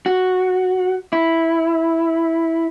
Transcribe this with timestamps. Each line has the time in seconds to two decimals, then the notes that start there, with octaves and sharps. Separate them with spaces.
0.06 F#4
1.13 E4